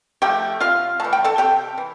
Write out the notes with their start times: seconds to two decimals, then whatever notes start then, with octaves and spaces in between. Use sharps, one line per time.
0.22 F3 A3 G4 G5
0.60 C3 F4 F5
1.00 E3 A3 A5
1.13 G5
1.24 A4 A5
1.38 C3 G4 G5
1.78 E3